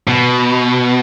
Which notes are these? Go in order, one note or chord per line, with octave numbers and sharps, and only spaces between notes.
B2